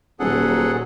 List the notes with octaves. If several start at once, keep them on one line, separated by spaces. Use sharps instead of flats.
D#1 A#2 F#3 G#4 A4 F#5